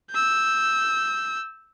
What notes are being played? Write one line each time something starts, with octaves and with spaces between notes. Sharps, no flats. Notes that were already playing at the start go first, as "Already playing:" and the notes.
E6 G6